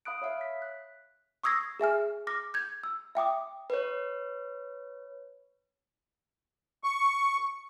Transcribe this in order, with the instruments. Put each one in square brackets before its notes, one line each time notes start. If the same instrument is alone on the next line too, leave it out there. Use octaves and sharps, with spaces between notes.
[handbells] F5 B5 D#6 F#6 D7
C#5 E5 F5
B6
F#6
[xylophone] C#6 D#6 E6 G#6 A#6 C7
G#4 E5 G#5 F6
D6 F6 A#6
G6 G#6
E6
E5 G5 D6 D#6
[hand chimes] B4 C#5
[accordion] C#6